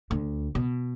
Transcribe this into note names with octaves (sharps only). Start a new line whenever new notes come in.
D2
B2